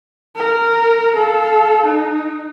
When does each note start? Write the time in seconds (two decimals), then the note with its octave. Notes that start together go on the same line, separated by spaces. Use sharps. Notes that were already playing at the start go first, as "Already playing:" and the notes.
0.36 A#4
1.15 A4 F5
1.85 D#4